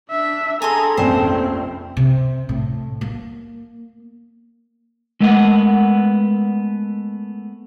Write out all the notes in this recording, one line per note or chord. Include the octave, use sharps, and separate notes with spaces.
D4 E5
G#4 A4 G#5 A#5 C6
F1 A#1 C4 C#4 C5
C3
A2
A#3
G#3 A3 B3 A#4 B4 F#5